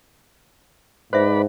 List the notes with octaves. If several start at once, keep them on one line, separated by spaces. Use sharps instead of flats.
G#2 B4 C5 D5 E5 B5